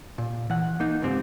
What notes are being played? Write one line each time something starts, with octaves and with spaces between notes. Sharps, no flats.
A#2
E3 F#5
A#3 D#4
C#2 G#2 C4 G4